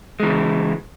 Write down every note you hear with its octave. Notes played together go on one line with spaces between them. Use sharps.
C#3 E3 G#3